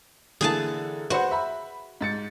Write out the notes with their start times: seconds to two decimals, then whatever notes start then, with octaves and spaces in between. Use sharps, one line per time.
0.41 D3 E3 A#3 G#4 G#5 A5
1.10 F#4 B4 C5 F#5
1.31 E5 B5
2.01 G#2 A6 C#7